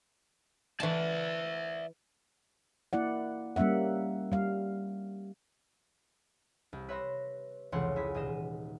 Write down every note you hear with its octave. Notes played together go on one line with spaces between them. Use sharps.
E3 D5 E5 A5
A#3 E4 D5 F#5
G3 A#3 C#4 E5 F#5
G3 F5
C2
B4 C#5 E5 C6 A#6
F1 C#2 E3 C#5 F#5 C6
E4 G#4 B6
D#1 G#4 D#5 E7